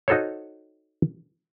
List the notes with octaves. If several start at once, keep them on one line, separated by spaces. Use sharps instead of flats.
D#4 F#4 A4 C5 C#5